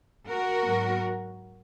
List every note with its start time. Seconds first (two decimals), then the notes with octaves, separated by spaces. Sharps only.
0.27 F#4 A#4
0.65 G#2 F#3 B3